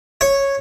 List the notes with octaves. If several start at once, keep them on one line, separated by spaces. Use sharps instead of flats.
C#5